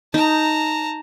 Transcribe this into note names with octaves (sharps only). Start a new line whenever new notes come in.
D#4 A5 A#5